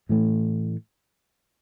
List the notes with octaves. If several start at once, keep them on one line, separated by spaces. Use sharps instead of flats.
A2 E3 A3